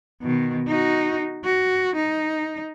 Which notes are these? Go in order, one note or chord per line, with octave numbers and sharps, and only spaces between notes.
B2 D#3
D#4 F#4
F#4
D#4